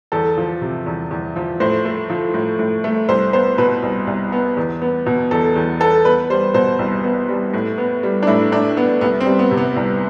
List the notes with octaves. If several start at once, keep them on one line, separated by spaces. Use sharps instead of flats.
E2 A4
F3
C3
E2
E2
F3
A2 C5
A3
F3
A2
A2
A3
C2 C5
B3 C5
B2 B4
C2
C2
B3
E2
B3
B2
E2 A4
E2
B3 A4
B3 B4
G3 C5
B2 C5
C2
B3
G3
A2
B3
G3
D4
A2 E4
A2 D4
B3
C2 B3
C4
G3
B3
C3
B3
C2